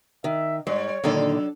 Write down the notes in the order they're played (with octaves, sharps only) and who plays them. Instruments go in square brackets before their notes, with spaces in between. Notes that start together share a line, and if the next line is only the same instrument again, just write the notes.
[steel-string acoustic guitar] D#3 [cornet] E5
[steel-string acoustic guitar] G#2 [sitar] G3 [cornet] C#5
[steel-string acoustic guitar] A#2 D3 D#3 [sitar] F#3 D4 A4